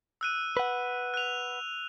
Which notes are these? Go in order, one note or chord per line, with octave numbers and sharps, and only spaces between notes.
E6 F#6 D#7
B4 F#5
F#6 F7